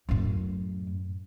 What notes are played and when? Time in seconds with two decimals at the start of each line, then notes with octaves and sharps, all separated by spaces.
0.09 F#2 A2